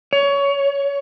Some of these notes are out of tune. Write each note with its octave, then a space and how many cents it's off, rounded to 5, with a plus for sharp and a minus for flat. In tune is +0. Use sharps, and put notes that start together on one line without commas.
C#5 +20